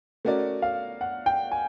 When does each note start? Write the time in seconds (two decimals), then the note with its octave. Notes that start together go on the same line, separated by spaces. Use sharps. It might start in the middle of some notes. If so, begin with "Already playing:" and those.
0.25 A3 C#4 F#4 A#4 D5
0.62 F5
1.01 F#5
1.26 G5
1.51 G#5